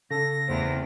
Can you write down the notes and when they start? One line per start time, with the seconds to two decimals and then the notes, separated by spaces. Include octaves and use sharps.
0.11 C#3 A4 A#6
0.48 E2 A3 C4